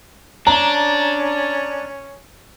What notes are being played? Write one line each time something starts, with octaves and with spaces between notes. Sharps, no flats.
C#4 D4 A#5